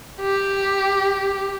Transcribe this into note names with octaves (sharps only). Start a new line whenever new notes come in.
G4